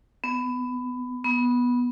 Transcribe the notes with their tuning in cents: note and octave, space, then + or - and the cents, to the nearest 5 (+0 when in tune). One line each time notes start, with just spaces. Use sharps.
B3 +20
B3 -10